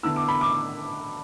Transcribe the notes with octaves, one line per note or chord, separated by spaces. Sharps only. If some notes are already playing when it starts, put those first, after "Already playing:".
D3 B3 E4 E6
D6
B5
D6